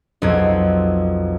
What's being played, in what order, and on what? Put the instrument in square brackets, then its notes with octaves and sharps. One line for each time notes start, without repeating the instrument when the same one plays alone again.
[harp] B1 F2 G#6